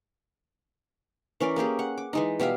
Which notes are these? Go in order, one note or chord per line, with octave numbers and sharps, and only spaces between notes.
E3 C#4 A#4 D5
A#3 C#4 G4 G#4
F#5
D6
E3 G#3 D#4
B2 G3 E5 F5